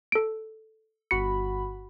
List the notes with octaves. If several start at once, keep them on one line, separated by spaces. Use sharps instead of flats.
A4 D7
G1 F#4 B5 C#7